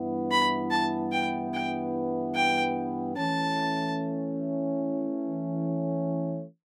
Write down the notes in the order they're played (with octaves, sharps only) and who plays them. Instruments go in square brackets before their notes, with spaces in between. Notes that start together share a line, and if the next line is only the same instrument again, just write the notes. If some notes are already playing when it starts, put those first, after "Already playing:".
Already playing: [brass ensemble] G2 E3 B3 E4
[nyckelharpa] B5
A5
G5
G5
G5
[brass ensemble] E3 A3 C#4 [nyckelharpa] A5